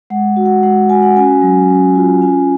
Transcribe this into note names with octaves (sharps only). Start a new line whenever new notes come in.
G#3 F#5
F#4
F#5
G#3 F#5
F#4 G#5
F#5
C#4 G#5
F#3
C#4
F4
C#4 G#5